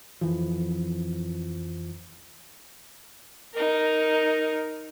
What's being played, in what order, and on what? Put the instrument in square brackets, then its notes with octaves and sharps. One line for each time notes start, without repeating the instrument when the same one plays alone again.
[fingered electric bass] F2 E3 F3
[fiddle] D#4 A#4